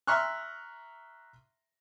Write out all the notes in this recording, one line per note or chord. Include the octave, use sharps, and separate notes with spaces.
E5 A#5 C6 C#6 F6 F#6